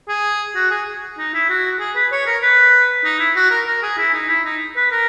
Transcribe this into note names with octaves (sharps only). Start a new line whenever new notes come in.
G#4
F#4
G#4
D#4
E4
F#4
G#4
B4
C#5
A#4
B4
D#4
E4
F#4
A#4
A#4
G#4
E4
D#4
E4
D#4
B4
A#4